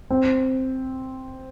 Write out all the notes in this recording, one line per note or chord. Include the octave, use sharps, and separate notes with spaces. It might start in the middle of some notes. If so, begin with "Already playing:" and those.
C4